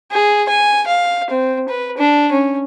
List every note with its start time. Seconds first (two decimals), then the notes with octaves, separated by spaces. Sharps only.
0.11 G#4
0.49 G#5
0.87 F5
1.30 C4
1.69 B4
1.98 D4
2.32 C#4